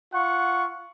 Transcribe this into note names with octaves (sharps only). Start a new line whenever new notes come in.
F4 F#5 C#6